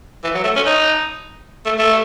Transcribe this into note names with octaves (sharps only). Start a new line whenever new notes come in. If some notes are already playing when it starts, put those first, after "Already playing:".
E3
F#3
A3
C#4
D#4
A3
A3